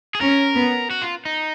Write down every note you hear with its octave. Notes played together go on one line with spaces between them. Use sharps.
G#4
C#4 A#4
B3
F#4
F4
D#4